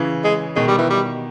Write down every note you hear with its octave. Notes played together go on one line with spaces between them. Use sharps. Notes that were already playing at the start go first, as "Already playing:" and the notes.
Already playing: C#3 E3
G#3
B2 D#3 G#3
G3
E3
G3